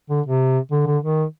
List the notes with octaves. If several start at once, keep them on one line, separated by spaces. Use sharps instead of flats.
D3
C3
D3
D3
D#3